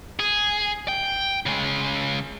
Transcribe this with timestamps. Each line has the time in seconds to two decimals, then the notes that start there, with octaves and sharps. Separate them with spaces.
0.19 G#4
0.88 G5
1.46 C#3 G#3